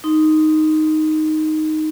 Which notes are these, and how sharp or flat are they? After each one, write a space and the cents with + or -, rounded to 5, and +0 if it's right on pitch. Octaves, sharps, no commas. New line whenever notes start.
D#4 +0 C6 +0